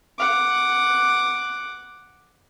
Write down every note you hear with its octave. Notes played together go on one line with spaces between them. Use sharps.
F#5 D6